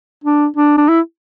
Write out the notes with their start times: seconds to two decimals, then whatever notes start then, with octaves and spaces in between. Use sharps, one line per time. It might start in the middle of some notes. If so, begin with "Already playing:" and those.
0.24 D4
0.57 D4
0.78 D4
0.89 E4